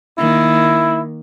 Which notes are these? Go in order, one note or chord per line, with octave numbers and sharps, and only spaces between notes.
D#3 A#3 E4